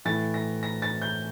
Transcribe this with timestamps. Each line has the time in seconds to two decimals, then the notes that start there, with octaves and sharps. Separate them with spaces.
0.05 A2 E3 A6
0.34 A#6
0.63 A#6
0.82 A6
1.02 G6